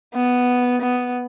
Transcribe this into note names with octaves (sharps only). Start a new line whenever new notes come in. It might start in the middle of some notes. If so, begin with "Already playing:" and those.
B3
B3